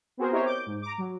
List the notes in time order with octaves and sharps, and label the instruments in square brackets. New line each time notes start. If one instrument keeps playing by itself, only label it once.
[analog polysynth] B3 C4 F#4 G#4 A#4 C5
E4 G4 A#4 C5 C#5 D#5
D6 G6
G#2
A#5 D6
F#3